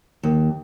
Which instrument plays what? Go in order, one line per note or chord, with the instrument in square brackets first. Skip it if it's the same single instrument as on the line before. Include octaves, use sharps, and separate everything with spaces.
[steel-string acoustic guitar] D#2